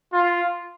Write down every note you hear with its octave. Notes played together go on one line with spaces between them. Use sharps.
F4